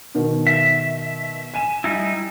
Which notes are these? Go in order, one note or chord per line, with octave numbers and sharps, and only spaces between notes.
B2 D#3
E5
G#5 D#7 E7
G3 D#4 E4